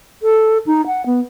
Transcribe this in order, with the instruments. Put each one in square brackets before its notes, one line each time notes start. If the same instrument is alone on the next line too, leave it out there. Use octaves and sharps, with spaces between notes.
[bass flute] A4
D#4
F#5
B3